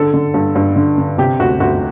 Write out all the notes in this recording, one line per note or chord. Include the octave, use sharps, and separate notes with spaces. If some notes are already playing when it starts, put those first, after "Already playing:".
Already playing: D3 A4
D3
G2
G2
D3
D3
C3 G4
D2 F#4
D2 F#4